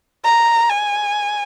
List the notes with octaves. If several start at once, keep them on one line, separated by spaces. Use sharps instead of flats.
A#5
G#5